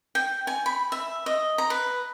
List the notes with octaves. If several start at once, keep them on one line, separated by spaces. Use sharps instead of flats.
G5
G#5
B5
E5
D#5
A#5
B4